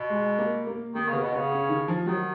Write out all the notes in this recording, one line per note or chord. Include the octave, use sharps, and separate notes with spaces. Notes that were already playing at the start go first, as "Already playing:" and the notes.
Already playing: B2
G#3
A#3
A#3
D#3 A#3
C#3 B3
B2
C#3 B3
C#4
D#3
F3
D#3 F#3